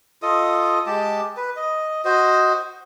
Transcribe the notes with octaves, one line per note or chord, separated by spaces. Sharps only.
F4 A4 D#5 D#6
G#3 G4 A5
B4
D#5
F#4 C5 D#5